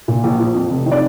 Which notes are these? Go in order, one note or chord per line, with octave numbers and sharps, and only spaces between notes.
A#2
A#1
F3
F2
F1
D#3
D5